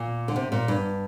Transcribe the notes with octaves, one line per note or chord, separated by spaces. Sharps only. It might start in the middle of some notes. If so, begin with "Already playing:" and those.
Already playing: A#2
D3
C3
A#2
G2